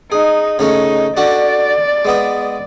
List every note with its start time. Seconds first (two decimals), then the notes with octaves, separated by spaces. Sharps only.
0.12 D#4 G#4
0.59 C#3 A3 C#4 D#4
1.17 D4 F#4 A4 D5
2.05 G#3 B3 E5